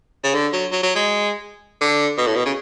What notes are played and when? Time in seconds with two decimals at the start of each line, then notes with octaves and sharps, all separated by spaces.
0.24 C#3
0.35 D3
0.53 F#3
0.72 F#3
0.83 F#3
0.96 G#3
1.81 D3
2.18 B2
2.27 A2
2.36 B2
2.46 C#3